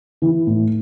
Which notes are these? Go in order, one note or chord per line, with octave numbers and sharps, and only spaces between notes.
E3
A2